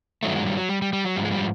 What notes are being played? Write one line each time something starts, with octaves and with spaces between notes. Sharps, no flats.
G2 D#3 F#3 A3
G#3
G3
F#3
G3
G3
G3
F#3
G#2 F3 G3
G#3
G3